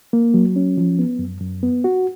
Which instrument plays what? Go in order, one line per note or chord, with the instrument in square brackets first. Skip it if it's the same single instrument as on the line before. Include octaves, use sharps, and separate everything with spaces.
[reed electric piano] A#3
F#3
C#4
F3
B3
F#2
F#2
B3
F#4